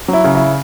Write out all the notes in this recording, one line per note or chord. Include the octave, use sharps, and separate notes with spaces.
F#3 E4
C#3
E4